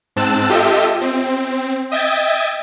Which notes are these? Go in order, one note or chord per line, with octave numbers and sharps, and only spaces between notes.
G#2 C4 A5 E6 F#6 E7
F4 G4 A4 D#5 E5 G5
C4
D#5 E5 G5 D#6 G#6 A6